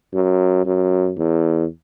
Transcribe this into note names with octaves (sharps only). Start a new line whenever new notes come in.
F#2
F#2
E2